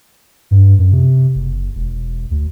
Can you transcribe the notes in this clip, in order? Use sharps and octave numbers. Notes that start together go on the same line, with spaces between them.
G2
F#2
C3
F#1
E1
D2